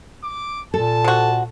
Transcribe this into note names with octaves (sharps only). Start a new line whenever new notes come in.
D6
A#2 A4 A5
C3 F#4